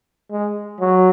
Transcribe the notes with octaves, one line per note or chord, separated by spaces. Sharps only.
G#3
F#3